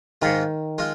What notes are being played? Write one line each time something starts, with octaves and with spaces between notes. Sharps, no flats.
G#2 D#3 G#3 F4
G#3 F4